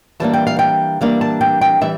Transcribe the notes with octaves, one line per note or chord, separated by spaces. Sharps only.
E3 G3 A#3 D4 A5
G5
F5
G5
E3 G3 A#3 D4 F5
A5
G5
G5
E3 G3 E5